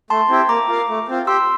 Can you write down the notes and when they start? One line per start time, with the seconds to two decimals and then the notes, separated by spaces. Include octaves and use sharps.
0.10 A3 A5 C6
0.29 C4 E4 G4
0.49 A#3 A#5 D6
0.68 F4 A#4 F5
0.89 A3
1.08 C4 F4
1.27 G4 C6 E6